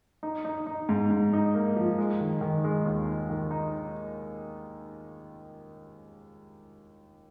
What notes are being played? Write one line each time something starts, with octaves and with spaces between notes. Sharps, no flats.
D#4
D#4
D#4
G#2
G#2
D#4
A#3
F3
G#3
D#3
D#3
G#3
D#2
D#4
D#3
D#4